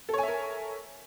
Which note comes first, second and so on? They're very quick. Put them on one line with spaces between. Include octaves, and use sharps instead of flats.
A4 C#5 G#5 E5 A#4